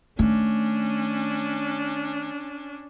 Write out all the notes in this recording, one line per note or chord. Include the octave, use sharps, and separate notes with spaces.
D#3 A3 C#4 D4